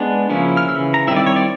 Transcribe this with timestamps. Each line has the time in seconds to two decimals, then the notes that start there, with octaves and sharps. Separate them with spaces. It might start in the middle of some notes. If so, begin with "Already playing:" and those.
Already playing: G#3 B3 D4
0.30 C#3 F3 A#3 C#4 E4
0.57 F6
0.68 C#3 E3 E6
0.94 A#5
1.07 D#3 G3 C4 E4 E5
1.16 D5
1.26 C#5
1.36 D5